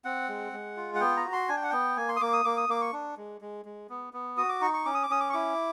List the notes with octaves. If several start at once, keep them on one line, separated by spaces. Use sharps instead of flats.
C4 F#5
G#3
G#3
F4
F#5
B3 G5
A#5
F#4
C6
D4 G#5
G5
F#5
B3 G5
A#3 G#5
C6
D#6
A#3 D6
D#6
A#3 D6
D#6
A#3 D6
C#6
D4
G#3
G#3
G#3
B3
B3
F#4 D#6
D6
D#4 C#6
C#6
C#4 D6
D#6
D6
C#4 D#6
D6
C#6
E4 D6